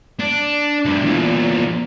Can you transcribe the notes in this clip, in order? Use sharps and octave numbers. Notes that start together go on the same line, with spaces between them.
D4
D2 G2
E2 A#2